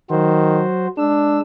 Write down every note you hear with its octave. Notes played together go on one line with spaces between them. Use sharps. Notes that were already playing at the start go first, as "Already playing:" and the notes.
D#3 F#3 F#4 C5
G#3 D4 E6